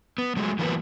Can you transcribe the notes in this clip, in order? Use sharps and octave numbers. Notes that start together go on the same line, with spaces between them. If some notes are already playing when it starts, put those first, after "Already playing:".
B3
F#3 G#3 A3
E3 F#3 A#3 B3 A4 B4